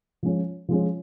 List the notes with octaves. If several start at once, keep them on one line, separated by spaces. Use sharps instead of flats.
F3 G#3 C#4
F3 G#3 C#4